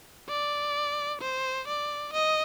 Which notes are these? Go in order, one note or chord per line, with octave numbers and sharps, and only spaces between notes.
D5
C5
D5
D#5